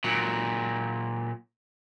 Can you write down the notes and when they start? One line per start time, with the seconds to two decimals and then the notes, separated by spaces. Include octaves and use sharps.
0.04 A#2 F#3